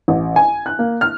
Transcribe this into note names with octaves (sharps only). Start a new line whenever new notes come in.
A1
G#5
F#6
A#3
F6